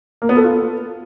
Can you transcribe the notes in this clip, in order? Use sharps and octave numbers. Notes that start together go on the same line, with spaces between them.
A#3
B3
A4
F4